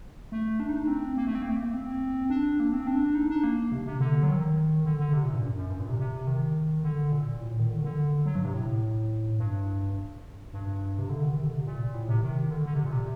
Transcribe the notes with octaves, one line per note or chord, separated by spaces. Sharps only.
A3
D4
D#4
D4
C4
A#3
A3
C4
A#3
A3
A#3
C4
D4
A#3
C4
D4
D#4
D4
A#3
C3
C3
D3
F#3
D#3
D3
D3
C3
A#2
G2
F#2
F#2
G2
A#2
C3
C3
D#3
D3
A#2
A2
A#2
D#3
D3
D#3
D3
F#3
G2
C3
A2
G2
G2
C3
D3
D#3
C3
D3
C3
A#2
A2
C3
D#3
D3
D3
C3
A#2
C3